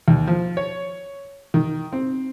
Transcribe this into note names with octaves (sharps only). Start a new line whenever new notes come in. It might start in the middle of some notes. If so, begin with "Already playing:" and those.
D#2
F3
C#5
D#3
C4